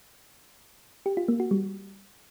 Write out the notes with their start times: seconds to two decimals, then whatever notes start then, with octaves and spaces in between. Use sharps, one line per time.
1.06 G4
1.17 F4
1.28 A#3
1.40 F#4
1.51 G3